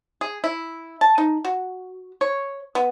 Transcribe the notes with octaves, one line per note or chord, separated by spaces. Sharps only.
G#4
E4
A5
D#4
F#4
C#5
B3